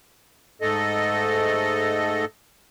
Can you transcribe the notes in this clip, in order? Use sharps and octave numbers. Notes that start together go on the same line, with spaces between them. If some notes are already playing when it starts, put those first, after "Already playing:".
G#2 A3 A4 D#5